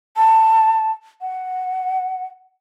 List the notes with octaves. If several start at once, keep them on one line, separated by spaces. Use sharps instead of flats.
A5
F#5